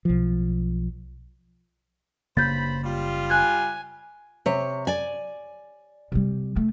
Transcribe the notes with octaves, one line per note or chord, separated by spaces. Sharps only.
B1 F3
F#1 G2 C#3 A#3 C5 B5 G6 A6
G3 F4
G#5 F#6 G#6
C3 C#5
D5 G#5
C3 G3
A3